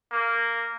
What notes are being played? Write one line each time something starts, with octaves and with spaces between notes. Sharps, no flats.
A#3